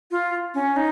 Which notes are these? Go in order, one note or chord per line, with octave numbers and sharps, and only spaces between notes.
F4
C#4
D#4